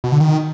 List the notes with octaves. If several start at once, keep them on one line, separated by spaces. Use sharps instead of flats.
B2
D3
D#3